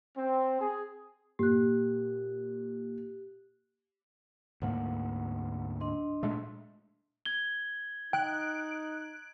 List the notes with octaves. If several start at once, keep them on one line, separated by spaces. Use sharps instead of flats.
C4
G#4
A#2 G4 F#6
D2 G#2 A#3 F#5
D4 D#5 C6
A#2 G#3 A3
G#6 G7
D#4 G5 F#6 D7